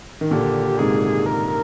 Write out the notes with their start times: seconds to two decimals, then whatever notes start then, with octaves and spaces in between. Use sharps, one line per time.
0.21 D#3
0.31 A#2 D3 G4
0.78 G#2 C3 G#4
1.26 A#4